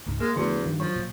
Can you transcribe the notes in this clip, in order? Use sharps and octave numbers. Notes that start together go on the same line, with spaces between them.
C#2 G#2
G#3 A#3 A#4
E2 D3 F3 A3 F#4
G2 D#3
F3 F#3
A#2